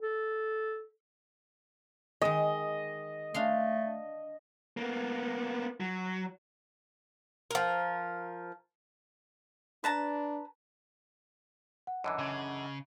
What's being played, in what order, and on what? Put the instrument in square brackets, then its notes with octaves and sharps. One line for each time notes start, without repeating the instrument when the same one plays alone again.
[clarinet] A4
[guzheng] D#3 G#3 [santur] D#5
[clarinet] A3 [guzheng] D4 F5 C6
[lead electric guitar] A#3 B3
F#3
[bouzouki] F3 A#4
[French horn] D4 [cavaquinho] B4 A5 A#5
[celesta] F#5
[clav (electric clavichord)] F#2 D3 E3 [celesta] D#5
[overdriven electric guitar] C#3